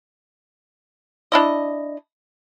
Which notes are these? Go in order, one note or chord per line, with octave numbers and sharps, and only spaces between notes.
D4 E4 D#5